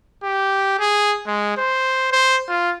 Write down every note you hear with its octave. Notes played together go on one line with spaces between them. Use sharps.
G4
G#4
G#3
C5
C5
F4